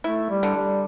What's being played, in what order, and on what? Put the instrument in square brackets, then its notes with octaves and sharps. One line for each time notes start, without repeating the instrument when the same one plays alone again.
[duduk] A3 [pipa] E4
[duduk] G3
[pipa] D3
[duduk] G3